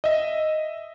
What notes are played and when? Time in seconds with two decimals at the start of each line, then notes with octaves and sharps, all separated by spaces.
0.04 D#5 E5